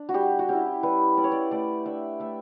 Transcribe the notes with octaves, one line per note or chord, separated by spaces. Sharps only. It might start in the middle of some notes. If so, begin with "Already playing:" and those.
Already playing: D4
F#4
G3 G4
F#4
C#4 E4 G4
G3 B4
C#4 E4 D5
C#5
D5
A3 D5
D4 E5
A3 E5